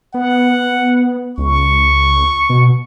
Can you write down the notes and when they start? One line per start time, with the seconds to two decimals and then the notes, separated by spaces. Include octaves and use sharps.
0.14 B3 F#5
1.38 C#2 C#6
2.50 B2